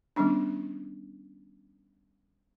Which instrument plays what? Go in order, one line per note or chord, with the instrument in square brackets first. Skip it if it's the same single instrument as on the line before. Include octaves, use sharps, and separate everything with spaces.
[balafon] D#3 G3 B3 C#4 D4